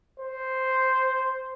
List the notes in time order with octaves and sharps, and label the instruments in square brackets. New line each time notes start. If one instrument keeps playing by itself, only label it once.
[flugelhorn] C5